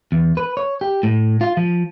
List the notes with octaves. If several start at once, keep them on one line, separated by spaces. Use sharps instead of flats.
E2
B4
C#5
G4
A2
F4
F3